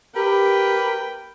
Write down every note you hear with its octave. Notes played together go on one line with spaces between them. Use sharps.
G4 A#4 B4 G5